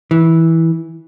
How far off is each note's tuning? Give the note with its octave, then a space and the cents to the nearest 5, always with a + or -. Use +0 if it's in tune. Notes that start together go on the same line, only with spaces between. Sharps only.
E3 -10